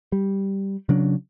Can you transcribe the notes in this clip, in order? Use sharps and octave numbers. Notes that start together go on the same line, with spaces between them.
G3
C#3 F#3 D4